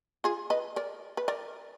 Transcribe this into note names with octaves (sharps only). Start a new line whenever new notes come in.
F4 G#4
B4 D#5
A#4 D5
B4
A#4 D5